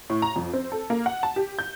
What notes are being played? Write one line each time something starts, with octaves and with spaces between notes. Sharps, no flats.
A2
A#5
F2
C4
A4
A#3
F#5
A5
G4
G6